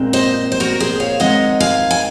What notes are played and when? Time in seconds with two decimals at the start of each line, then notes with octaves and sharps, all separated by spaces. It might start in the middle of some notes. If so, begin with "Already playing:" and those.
Already playing: A#2 G#3 C4
0.13 C5 D#5
0.52 C5
0.60 F#4 A#4
0.80 G#4 C5
1.00 C#5 F5
1.20 D#3 G#3 C4 D#5 F#5
1.60 F5 G#5
1.91 G#5